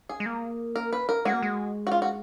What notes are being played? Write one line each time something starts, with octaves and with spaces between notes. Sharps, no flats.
G#4
G#3
A#3
A#4
B4
A#4
G#3 F#4
A#3
G#3
F#4
F4
F#4